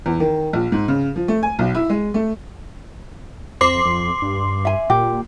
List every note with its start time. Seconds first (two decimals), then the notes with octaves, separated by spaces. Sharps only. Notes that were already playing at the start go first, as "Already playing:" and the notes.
0.06 E2
0.20 D#3
0.53 A#1
0.72 G#2
0.88 C#3
1.16 F3
1.28 A3
1.43 G#5
1.59 B1
1.75 E4
1.90 G#3
2.14 A3
3.61 F2 C5 C6 D6 C7
3.85 F2
4.22 G2
4.65 E5 G#5
4.90 A#2 G4